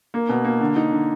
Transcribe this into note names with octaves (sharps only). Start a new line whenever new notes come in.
A#3
B2
A#3
D3
D#4
D3